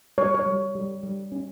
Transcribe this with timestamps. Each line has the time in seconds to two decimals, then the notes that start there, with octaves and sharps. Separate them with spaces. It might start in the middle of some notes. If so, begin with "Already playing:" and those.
0.18 G3 C#5
0.34 C#5
0.46 G3
0.75 G3
1.03 G3
1.32 C#4